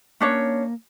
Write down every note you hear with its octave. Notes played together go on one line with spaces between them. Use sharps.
A#3 C#4 D4 C#5